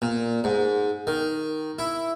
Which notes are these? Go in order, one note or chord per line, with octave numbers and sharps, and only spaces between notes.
A#2
G#2
D#3
E4